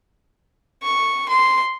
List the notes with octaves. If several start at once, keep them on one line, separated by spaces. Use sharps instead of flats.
C#6
C6